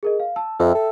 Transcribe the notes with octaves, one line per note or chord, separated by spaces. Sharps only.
G#4 A#4 D#5
F5
A5 E6
F2 E5 G5 E6
A4